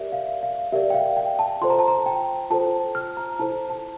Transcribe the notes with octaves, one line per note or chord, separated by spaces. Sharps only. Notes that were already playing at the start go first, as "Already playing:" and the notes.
Already playing: G4 A#4 D5 E5
F5
F5
G4 A#4 D5 E5
G5
F5
G5
A5
F4 A4 C5 C6
A#5
A5
A#5
G5
F4 A4 C5 A5
F6
A#5
E4 A4 C5 A5
A5